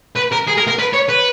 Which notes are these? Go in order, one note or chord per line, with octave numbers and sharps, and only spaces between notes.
B4
A#4
G#4
A#4
A#4
B4
C#5
B4